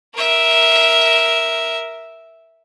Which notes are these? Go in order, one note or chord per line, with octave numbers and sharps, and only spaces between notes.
A#4 E5